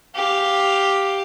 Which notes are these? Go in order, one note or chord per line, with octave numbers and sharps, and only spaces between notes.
G4 F5